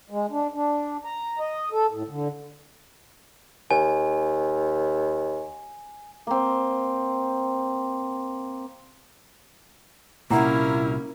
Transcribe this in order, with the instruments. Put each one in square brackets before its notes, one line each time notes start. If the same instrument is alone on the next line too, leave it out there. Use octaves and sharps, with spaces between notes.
[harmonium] G#3
D4
D4
A#5
D#5
A4
A2
D3
[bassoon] D#2 [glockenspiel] G#5
[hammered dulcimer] A#3 C4
[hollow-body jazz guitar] C2 A#2 [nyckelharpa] A#3 C#4 [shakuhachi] E4 [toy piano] F#5 A#5 B5